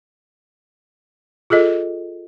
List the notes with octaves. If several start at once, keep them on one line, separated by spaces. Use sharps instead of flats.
F4 G#4 A4 D#5